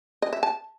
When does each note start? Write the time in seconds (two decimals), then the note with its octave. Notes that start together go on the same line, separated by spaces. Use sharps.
0.22 D#5
0.33 E5
0.43 A5